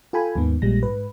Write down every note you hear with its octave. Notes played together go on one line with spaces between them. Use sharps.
F4 A4 G5 G#5 B5
D#2 G#2 D#3 B3
A#1 A#2 G3 G#3 A#6
G#2 B4